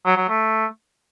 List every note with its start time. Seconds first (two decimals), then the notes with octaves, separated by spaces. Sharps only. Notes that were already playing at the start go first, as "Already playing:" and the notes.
0.06 F#3
0.17 F#3
0.28 A3